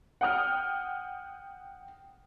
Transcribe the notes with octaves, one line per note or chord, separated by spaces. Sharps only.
F#5 G5 D#6 F6